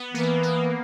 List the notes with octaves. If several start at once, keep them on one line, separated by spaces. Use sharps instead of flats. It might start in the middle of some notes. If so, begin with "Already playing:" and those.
Already playing: B3
E3 A#3
A#3